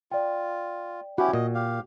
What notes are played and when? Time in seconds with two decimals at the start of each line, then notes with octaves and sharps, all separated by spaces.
0.12 F4 D5 G5
1.18 C#4 E4 F#4 G4 B4
1.33 A#2 D#5
1.55 G4 F5